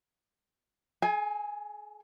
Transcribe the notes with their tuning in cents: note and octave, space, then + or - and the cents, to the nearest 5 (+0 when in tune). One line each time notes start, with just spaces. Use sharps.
G#4 +40 G#5 -10